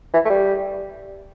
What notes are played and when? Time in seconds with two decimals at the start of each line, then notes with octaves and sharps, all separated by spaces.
0.13 E3
0.25 A3
0.30 G3